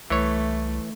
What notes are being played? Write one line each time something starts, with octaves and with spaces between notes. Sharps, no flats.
C2 E3 A3 C#5